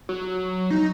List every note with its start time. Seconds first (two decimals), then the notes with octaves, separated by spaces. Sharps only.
0.09 F#3
0.71 D#4